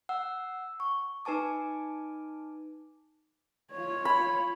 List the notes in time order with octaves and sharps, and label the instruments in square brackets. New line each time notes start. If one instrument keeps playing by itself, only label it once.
[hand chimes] F#5 E6
C#6
D#4 B4 G#5 A5 D6
[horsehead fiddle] F4 C#5
[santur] B5